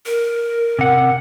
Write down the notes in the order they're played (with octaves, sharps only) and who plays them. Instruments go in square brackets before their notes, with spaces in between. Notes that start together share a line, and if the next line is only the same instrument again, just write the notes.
[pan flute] A#4
[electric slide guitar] C3 F#5